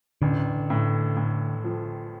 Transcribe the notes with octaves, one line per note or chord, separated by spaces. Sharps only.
A1 D3
A2
A2
F3